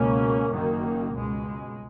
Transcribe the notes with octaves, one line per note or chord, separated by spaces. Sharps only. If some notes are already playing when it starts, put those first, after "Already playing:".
Already playing: C#2 B2 A#3 C#4
F#1 F#2 D#3 A#3
C#2 B2 G#3